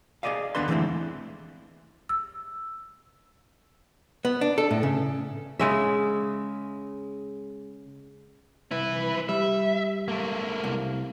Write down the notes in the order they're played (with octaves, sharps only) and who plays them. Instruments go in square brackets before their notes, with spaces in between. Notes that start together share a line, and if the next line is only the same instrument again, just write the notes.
[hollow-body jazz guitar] G#4 A4 D5 D#5 F5
D#2 D3 B3 D4 B4 C6
D3 E3 G#3 A3 C4 E4
[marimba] E6
[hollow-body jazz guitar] B3
D4
A4
A2
C#3
[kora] C#3 G#3 E5
[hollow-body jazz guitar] C2 [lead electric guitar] E4 B4
[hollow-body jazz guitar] G3 [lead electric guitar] E5
[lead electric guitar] A3 A#3
[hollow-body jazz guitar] C2